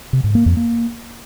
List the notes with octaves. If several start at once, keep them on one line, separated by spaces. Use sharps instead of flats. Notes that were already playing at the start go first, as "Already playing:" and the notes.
C3
G#2
A#3
F2
A#3